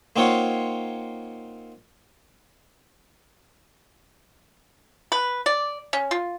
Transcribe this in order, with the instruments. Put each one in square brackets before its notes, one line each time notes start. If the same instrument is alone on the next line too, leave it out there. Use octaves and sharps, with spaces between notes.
[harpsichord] A#3 C4 D#4 F4 C#5 F#5
[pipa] B4
D5
C#4
F4